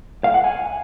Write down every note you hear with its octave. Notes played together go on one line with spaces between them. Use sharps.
F5
F#5
G#5